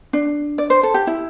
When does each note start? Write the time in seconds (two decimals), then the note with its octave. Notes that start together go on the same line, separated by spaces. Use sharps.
0.13 D4
0.58 D5
0.70 C5
0.83 A4
0.94 G4
1.07 E4